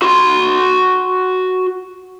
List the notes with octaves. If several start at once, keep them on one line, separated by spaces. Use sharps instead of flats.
F#4 C6